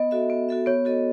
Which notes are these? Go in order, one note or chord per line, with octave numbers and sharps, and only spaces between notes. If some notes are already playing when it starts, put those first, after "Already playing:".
Already playing: B3 D#5
F#4 A4 E5
B3
F#4 A4 E5
B3 C#5
F#4 A4 D#5